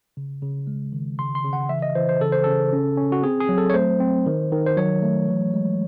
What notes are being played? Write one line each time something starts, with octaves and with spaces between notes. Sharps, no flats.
C#3
C#3
G#3
D#3
C#3 C6
C6
C#3
F#5
E3 E5
D#5
E3 C5
C5
C#3 A4
C5
C#3 A4
C#4
C#4
F#4
C4 G#4
G#4
F#3
A4
C#5
A3 C5
C4
D#3
D#3
C5
F#3 C#5
A3
E3
G#3